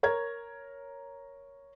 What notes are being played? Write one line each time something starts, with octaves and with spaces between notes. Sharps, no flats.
A#4 C#5 A#5 G#6